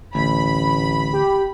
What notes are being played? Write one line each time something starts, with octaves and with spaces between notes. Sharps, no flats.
A1 D2 B5
G4